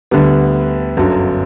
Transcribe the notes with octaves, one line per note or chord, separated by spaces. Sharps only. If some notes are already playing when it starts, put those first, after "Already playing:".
D2 D3 G3 B3
G1 F#2 D3 F#3